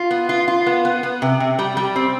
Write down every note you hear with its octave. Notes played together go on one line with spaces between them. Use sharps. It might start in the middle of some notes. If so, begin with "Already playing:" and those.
Already playing: F4
B3
F4
F4
B3
B3
B3
C3
C3
G3
G3
C4